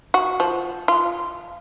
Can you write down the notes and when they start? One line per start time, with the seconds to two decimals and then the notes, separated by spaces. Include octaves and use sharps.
0.14 F#4
0.40 F3
0.88 F4